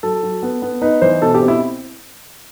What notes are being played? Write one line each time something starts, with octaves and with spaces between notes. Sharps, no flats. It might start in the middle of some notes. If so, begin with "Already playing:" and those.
F#3 A4
F#3
B3
B3
D#4 B4
E3 C5
B2 A4
G4
C4
E4